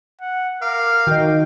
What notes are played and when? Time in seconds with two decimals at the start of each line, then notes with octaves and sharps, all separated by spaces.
0.21 F#5
0.62 A#4 F5 D6
1.07 D#3 F#4 A#4 D#5 G5